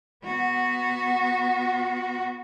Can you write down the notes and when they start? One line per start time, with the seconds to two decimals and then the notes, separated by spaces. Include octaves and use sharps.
0.24 B3 F#4